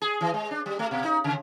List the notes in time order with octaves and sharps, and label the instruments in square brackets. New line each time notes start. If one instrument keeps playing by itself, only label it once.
[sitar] G#4
E3
G#3
D4
G3
A3
B2
D#4
C#3